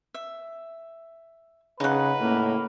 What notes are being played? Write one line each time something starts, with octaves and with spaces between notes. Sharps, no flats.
E5
C#3 D#4 B4 F#5
A2 A#3